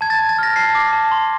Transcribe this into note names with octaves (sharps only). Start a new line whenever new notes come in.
A5 G#6
A6
G#6
A5
A6
F6 A#6
A5 C7
D6
A5
C6